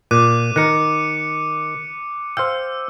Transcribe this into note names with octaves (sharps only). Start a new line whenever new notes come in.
A#2 D6 F#6 D#7
D#3 A#4 F#6 C#7
C5 F5 G5 E6